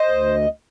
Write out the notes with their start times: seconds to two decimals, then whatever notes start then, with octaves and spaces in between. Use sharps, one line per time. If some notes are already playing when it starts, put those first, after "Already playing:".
Already playing: C5 D#5
0.09 D2